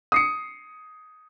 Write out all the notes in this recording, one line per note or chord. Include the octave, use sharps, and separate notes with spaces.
D#6 C7 C#7